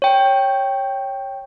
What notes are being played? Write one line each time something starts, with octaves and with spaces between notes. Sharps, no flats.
C#5 G5